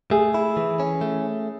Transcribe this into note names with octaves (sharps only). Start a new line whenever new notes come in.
A3 G#4
E4
E3
C#4
A3